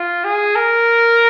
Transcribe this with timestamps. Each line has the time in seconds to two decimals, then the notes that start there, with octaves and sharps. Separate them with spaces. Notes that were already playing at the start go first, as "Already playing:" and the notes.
Already playing: F4
0.24 G#4
0.56 A#4